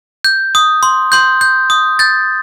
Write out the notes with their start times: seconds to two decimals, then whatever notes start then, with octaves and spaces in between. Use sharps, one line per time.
0.24 G6
0.55 D#6
0.83 C6
1.12 C6 G6
1.41 G6
1.70 D#6
1.99 G6 A6